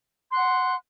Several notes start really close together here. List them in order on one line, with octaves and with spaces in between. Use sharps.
C6 F#6 F#5